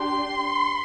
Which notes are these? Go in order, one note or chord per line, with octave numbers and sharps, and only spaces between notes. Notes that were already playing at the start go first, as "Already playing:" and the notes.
Already playing: D4 G4 C6